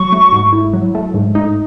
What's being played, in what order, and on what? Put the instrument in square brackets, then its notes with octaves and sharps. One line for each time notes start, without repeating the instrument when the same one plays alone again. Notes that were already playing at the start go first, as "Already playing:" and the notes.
Already playing: [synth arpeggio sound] F#3 [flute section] C#6
[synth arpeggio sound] A3
G#2
E4
F#3
A3
G#2
D#4